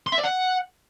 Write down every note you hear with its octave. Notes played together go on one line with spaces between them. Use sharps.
C6
E5
D5
F#5